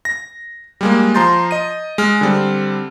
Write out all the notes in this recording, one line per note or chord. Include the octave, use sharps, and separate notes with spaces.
A#6
G3 G#3 A#3
F3 A#5 C6 G6 A6
D#5 D#7
G#3 F6
D3 G3 C4